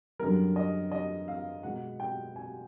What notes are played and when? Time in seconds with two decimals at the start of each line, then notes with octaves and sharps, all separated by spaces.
0.19 F#2 D3 G3 A#4
0.56 D#5
0.92 D#5
1.28 F5
1.63 B2 G#3 F#5
2.00 G5
2.36 G#5